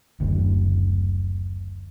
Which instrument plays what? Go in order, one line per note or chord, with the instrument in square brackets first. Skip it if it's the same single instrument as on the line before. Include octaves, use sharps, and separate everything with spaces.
[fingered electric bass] F#1 D2